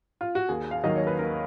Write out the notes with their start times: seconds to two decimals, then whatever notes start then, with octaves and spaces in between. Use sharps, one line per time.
0.21 F4
0.35 F#4
0.49 D#2 G#4
0.71 F5
0.84 D#3 F#3 A#3 D#5
0.96 C#5
1.07 B4
1.19 D#2 A#4